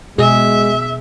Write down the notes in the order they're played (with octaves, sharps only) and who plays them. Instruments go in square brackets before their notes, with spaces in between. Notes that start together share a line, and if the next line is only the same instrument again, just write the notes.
[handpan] B2 G#4 [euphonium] G#3 [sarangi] E5